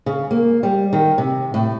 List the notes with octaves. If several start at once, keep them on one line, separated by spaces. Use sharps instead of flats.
C#3
A#3
G3
D#3
C3
A2